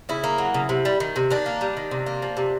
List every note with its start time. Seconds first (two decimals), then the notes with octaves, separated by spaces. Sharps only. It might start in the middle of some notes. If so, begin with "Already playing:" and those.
0.09 C#3 E4
0.24 A#3
0.38 F#3
0.54 C#3
0.69 C3
0.85 G3
1.00 D#3
1.16 C3
1.31 D#3 D4
1.46 A#3
1.61 G3
1.77 D#3
1.91 C3
2.06 A#3
2.22 F3
2.37 C3